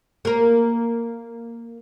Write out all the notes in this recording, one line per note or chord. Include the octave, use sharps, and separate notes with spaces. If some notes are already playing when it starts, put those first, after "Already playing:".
A#3 A#4